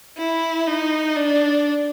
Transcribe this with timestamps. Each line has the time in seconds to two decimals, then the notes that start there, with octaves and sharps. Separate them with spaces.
0.18 E4
0.67 D#4
1.16 D4